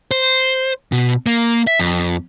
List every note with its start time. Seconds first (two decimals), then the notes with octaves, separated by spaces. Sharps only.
0.11 C5
0.92 B2
1.26 A#3
1.67 E5
1.80 F2